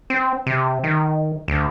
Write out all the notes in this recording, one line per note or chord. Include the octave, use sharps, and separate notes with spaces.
C4
C3
D#3
D2